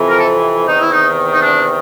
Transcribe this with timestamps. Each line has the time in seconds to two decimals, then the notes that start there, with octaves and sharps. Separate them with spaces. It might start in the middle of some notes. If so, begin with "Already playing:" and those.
Already playing: F2 C3 E3
0.10 A#4
0.18 A4
0.67 E2 C3 D#3 D#4
0.80 E4
0.92 D#4
1.33 D#4
1.41 D4